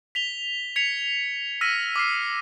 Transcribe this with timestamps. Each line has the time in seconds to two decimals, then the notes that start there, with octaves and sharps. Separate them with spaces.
0.15 B6 F7 G7
0.76 G#6 B6 C#7 F7
1.61 E6 F6 A#6 B6 D#7
1.96 D6 F6 C7